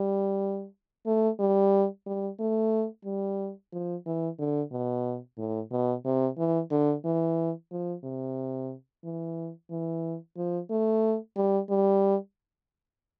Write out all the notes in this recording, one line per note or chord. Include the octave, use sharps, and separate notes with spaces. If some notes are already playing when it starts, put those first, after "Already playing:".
Already playing: G3
A3
G3
G3
A3
G3
F3
E3
D3
B2
A2
B2
C3
E3
D3
E3
F3
C3
E3
E3
F3
A3
G3
G3